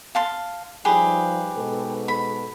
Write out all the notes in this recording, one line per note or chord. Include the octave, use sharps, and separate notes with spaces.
F5 A5 C6
F3 G3 D#4 G4 G#4 B4
G#2 B2 A4
B5